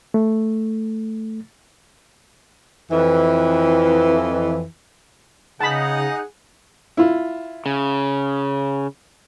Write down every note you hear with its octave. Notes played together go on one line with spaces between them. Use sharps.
A3
F2 E3
C#3 D#4 G#4 F#5 A5 B5
E4 F4
C#3